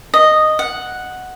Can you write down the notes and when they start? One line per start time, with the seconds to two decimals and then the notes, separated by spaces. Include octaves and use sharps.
0.14 D#5
0.59 F#5